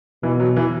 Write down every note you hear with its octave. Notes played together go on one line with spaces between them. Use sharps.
B2 E3
F#3
E3